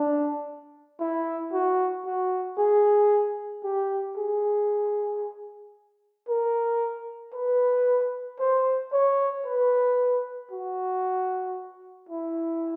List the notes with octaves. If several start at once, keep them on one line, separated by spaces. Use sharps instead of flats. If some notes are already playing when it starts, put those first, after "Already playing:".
Already playing: D4
E4
F#4
F#4
G#4
G4
G#4
A#4
B4
C5
C#5
B4
F#4
E4